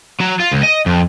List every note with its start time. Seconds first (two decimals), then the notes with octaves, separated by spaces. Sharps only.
0.21 F#3
0.40 F4
0.51 C#2
0.63 D#5
0.86 F2